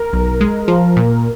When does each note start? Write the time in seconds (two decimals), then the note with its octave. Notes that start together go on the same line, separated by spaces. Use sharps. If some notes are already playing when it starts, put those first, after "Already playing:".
Already playing: A#4
0.13 B1
0.41 G#3
0.68 F3
0.96 A#2